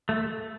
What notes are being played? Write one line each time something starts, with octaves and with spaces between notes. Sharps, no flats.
A3